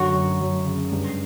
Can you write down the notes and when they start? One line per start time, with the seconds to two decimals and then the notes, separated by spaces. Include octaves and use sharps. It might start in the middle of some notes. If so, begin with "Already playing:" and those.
Already playing: F#2 D3 A3 F#4
0.14 F#2
0.41 F#2
0.65 C#3
0.92 G2